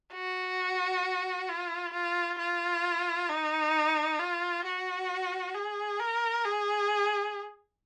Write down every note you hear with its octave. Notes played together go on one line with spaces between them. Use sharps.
F#4
F4
F4
F4
D#4
F4
F#4
G#4
A#4
G#4